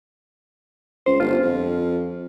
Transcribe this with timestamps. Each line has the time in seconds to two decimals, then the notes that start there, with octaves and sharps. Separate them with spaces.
1.06 C#2 C5
1.20 G1 F4
1.43 F2